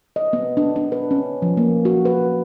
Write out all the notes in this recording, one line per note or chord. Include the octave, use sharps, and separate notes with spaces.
D#5
B3
D4
D4
B4
C#4
F3
A#3
F#4
B4